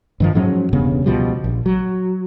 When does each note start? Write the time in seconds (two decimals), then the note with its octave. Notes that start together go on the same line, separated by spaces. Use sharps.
0.20 G2 D#3 F3
0.35 G#2 F3 F#3 C#4
0.73 E1 G2 C#3 B3
1.06 C#2 B2 F3 G3
1.44 A#1
1.66 F#3